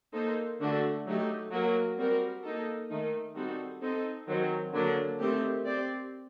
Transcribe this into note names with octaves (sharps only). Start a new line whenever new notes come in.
A#3 D#4 A4 C5
D3 A3 D4 F#4 A4
F#3 A3 D#4 G4
F#3 A#3 F#4 A#4
G3 C4 F#4 A#4
A#3 D#4 A4
D#3 A3 D#4
G3 C4 D#4 F#4 A4
C4 D#4 A4
D#3 F#3 C4
D3 F#3 A#3 D4
D#3 A3 C4 G4
C4 G4 D5